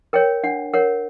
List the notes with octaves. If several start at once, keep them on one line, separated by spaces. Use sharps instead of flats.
A#4 C#5 G5
D4 F#5
A#4 C#5 F#5